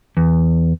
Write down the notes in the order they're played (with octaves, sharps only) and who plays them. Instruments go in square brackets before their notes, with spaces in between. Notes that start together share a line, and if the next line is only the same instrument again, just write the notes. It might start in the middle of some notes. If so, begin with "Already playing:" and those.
[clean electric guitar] E2